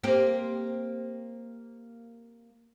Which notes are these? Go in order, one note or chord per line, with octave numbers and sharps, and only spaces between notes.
A#3 C4 G4